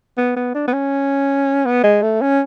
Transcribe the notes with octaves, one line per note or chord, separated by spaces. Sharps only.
B3
B3
D4
B3
C#4
B3
G#3
A3
C#4